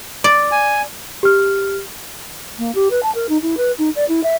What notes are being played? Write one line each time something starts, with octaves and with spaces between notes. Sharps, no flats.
D5
G#5
G4 F6
A#3
G4
B4
A5
A#4
D#4
E4
B4
D#4
D5
E4
E5